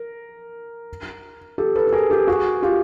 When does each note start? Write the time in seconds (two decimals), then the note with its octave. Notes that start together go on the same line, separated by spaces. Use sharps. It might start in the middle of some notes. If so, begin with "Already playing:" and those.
Already playing: A#4
1.58 G4 A4
1.76 A4 B4
1.87 A4
1.93 G#4 A#4
2.10 G4 A4
2.27 F#4 G#4
2.63 F4 G4